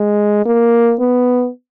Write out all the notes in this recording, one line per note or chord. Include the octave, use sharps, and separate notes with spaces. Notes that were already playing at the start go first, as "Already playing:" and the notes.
Already playing: G#3
A#3
B3